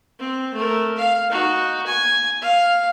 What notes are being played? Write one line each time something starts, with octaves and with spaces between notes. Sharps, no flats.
C4
A3 A#4
F5
D#4 F#4
G#5
F5